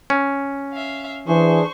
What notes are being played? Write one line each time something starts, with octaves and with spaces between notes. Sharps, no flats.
C#4
E5 F5
E3 D4 G#4 C5 C#6